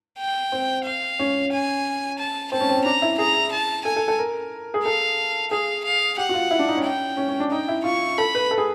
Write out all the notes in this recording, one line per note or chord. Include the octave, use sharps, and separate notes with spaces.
G5
C4
F5
C#4
G#5
A5
C4 A5
C#4
C4
C#4
D4 A#5
E4
G#4 A#5
A5
A4 G#5
A4
A4
A#4
G#4
A4 F5
G#4 F5
F5
G4 F#5
F#4
F4
E4
D4
D#4
C#4
G5
C#4
C#4
D4
D#4 G5
E4
F4 C#6
A4 B5
B4
A4
G#4